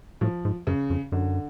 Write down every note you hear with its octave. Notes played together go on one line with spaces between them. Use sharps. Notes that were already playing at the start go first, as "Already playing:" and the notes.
A2 F3
G#2
F#2 C#3
F2
F#2 D3